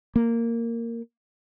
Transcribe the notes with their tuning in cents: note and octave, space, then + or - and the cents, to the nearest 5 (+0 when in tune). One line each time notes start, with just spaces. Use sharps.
A#3 -10